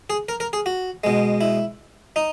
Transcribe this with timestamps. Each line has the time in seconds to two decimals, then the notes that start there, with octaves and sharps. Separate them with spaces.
0.10 G#4
0.29 A#4
0.40 A#4
0.53 G#4
0.66 F#4
1.04 B2 G#3
1.41 E4
2.16 D#4